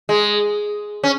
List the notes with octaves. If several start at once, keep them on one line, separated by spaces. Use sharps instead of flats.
G#3
C#4